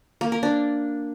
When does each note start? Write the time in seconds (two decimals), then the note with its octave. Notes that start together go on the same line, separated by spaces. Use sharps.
0.21 A#3
0.32 A#4
0.43 D4